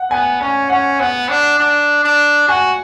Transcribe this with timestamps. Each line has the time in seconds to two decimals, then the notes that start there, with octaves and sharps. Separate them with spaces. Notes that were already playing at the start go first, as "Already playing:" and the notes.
Already playing: F#5
0.11 B3 G#5
0.41 C#4 G#5
0.70 C#4 F#5
1.00 B3 F#5
1.29 D4
1.59 D4
2.03 D4
2.48 F#4 G#5